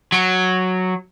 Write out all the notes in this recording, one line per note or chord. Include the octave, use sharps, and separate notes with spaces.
F#3